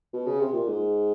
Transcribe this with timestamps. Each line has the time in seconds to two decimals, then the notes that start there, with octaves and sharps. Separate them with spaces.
0.13 B2
0.27 C#3
0.40 C3
0.53 A#2
0.68 G#2